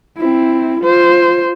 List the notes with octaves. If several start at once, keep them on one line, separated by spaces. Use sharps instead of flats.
C4 E4
F4 C5